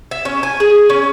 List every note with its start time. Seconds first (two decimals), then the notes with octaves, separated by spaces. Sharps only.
0.11 E5
0.25 C#4
0.43 G#5
0.60 G#4
0.90 C#4